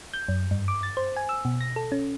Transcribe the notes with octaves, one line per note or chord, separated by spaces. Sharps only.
G6
F#2
G2
D6
A6
C5
G#5
E6
B2
A#6
A4
C#4